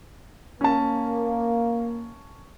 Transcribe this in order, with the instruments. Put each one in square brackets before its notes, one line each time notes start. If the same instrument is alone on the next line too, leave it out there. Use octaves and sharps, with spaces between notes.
[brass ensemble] A#3 [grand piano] C#4 A5